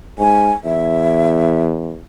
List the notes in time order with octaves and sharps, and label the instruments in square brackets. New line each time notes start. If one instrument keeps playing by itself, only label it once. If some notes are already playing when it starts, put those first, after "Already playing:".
[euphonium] G#2 [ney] G#5
[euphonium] E2 [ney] E5